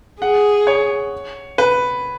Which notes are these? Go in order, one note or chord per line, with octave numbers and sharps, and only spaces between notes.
G#4 F#5
C#5
B4